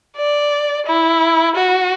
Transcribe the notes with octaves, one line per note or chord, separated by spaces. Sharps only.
D5
E4
F#4